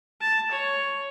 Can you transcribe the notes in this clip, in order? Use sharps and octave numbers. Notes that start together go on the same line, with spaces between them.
A5
C#5